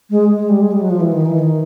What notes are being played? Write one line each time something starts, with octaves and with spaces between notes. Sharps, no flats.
G#3
G#3
G3
G#3
G3
F#3
F3
E3
D#3
E3
D#3